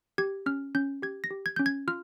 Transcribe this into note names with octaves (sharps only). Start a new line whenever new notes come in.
G4 G#6
C#4 F6
C#4 G6
G4 G#6
A#6
G4
G#6
C#4 G6
G#6
F4 F6